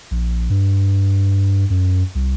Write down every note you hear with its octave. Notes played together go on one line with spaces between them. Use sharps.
A#1
G2
F#2
C2